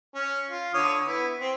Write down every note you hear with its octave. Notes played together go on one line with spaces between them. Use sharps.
C#4
F4
D3 C#5 D#6
B3 E4
C4